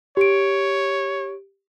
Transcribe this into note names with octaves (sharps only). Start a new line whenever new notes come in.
G4 C#5 D7